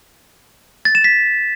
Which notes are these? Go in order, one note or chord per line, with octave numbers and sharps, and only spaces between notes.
A6
E7
B6